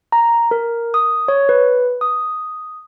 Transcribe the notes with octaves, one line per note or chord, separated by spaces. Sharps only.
A#5
A#4
D#6
C#5
B4
D#6